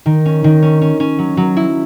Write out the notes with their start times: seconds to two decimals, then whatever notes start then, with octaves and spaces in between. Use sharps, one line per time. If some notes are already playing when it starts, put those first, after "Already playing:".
0.06 D#3
0.25 C#4
0.44 D#3
0.63 C#4
0.81 C#4
1.00 C#4
1.19 F#3
1.37 F#3
1.57 E4